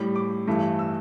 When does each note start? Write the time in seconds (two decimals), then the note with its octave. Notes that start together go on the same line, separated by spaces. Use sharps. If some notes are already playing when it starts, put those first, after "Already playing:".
Already playing: A2 G3
0.15 D6
0.48 G2 E3 A3
0.79 E6